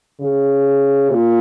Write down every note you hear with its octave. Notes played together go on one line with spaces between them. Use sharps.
C#3
A#2